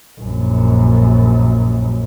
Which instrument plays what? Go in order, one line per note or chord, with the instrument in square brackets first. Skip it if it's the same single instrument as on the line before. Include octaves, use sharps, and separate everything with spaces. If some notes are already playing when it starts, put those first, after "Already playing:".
[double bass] A#1 F#2